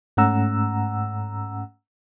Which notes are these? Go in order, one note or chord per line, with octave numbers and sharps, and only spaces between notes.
G#2 A3 C#4 F#5 A#5 E6